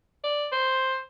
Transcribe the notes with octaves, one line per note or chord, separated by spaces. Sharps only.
D5
C5